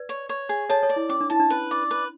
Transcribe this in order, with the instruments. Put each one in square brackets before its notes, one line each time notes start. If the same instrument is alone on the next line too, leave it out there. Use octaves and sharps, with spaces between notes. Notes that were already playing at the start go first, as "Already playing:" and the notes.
Already playing: [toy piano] B4 D5
[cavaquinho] C#5
C#5
G#4
[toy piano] A4 C#5 [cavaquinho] A5
[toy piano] A4 C#5
[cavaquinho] D5
[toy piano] E4
[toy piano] C#4 [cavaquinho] D6
[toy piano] D4
[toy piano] E4 [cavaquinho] A5
[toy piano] D4
[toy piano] C#4 [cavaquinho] B4
[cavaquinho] D5
B4